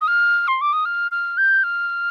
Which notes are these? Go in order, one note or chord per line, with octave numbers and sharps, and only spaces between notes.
D#6
F6
C6
D6
D#6
F6
F6
G6
F6